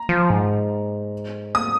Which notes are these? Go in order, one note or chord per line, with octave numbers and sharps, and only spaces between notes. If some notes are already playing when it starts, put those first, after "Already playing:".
Already playing: A#5
F3
G#2
D#6